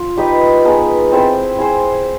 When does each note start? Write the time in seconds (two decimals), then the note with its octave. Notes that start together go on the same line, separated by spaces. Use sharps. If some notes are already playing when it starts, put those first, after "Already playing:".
Already playing: F4
0.17 D#4 G4 B4 D#5
0.65 G#3 B3 D#4
1.12 C4 E4 A4 C5
1.58 E4 G#4 C5